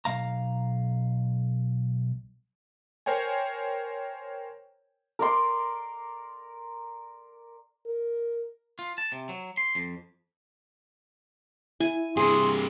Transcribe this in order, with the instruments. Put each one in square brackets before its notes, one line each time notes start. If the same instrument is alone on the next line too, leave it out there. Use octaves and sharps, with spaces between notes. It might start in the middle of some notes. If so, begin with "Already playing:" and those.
[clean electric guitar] B1 F5 A#5
[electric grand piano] A#4 C5 C#5 G5 G#5
[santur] A#4 D5 C6
[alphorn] A#4
[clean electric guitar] F4
A5
C3
F#3
C6
F2
[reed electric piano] E4 [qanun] G#5
[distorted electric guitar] G2 C3 [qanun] G#4 [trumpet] C6